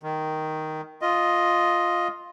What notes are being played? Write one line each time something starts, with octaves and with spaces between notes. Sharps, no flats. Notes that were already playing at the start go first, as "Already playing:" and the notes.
D#3
F4 D#5